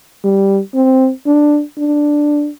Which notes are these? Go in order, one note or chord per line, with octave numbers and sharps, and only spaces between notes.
G3
C4
D4
D4